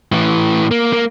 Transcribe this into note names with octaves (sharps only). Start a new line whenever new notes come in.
A2 E3
A#3
A#3